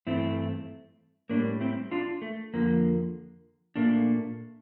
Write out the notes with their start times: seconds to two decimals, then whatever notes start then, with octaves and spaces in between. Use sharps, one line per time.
0.07 G2 E3 A3 C4 E4
1.29 A2 G3 A#3 D4
1.61 C4 E4
1.91 D4 F4
2.22 A3
2.54 F2 D3 F3 A#3
3.76 A#2 A3 A#3 D4